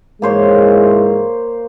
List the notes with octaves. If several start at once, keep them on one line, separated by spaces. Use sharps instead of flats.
G#2 E3 G#3 A#3 C5 C#5